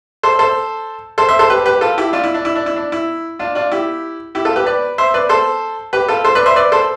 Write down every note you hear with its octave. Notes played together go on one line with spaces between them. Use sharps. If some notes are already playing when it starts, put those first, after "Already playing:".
A4 C5
A4 C5
A4 C5
C5 E5
A4 C5
G4 B4
G4 B4
F4 A4
E4 G4
D4 F4
E4
D4
E4
D4
E4
D4
E4
D4 F4
D4 F4
E4 G4
E4 G4
F4 A4
G4 B4
B4 D5
C5 E5
B4 D5
A4 C5
G4 B4
F4 A4
A4 C5
B4 D5
C5 E5
B4 D5
A4 C5